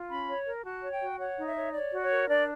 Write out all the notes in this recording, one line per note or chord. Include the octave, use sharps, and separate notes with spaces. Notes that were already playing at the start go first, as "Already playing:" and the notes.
Already playing: F4
C#4 B5
C#5
A#4
F#4 A5
C#5
G5
F#4
C#5 F#5
D#4
E5
C#5
C#5 D5
F#4
C#5
A#4
D4 D5